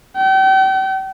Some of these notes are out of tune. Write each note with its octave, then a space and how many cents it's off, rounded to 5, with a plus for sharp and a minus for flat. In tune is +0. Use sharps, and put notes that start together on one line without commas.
G5 -40